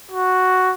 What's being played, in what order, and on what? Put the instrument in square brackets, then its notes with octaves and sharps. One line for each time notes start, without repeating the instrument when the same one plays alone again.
[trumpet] F#4